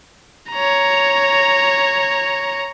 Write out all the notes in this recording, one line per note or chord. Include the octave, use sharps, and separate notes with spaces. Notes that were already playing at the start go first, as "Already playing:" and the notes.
C#5 A#5